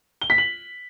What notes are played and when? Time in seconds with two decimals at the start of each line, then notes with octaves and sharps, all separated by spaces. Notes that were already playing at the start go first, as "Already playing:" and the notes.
0.21 G7
0.30 B6
0.38 F#7